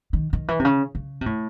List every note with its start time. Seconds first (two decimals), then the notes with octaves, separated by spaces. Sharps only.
0.13 D#3
0.33 D#3
0.48 E3
0.59 C3
0.65 C#3
0.95 C#3
1.21 C3
1.26 A2